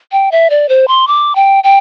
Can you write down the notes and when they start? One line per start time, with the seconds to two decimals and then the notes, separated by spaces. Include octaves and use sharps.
0.12 G5
0.32 E5
0.50 D5
0.69 C5
0.88 C6
1.07 D6
1.35 G5
1.64 G5